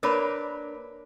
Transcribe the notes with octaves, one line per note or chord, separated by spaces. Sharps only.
A#3 D4 A#4 B4 C#5 B5